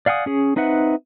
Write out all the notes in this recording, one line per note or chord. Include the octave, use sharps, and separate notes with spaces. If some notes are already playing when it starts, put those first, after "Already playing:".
D5 F5 F#5 G#5 D#6
C#4 G#4
C4 D#4 B4 E5 F#5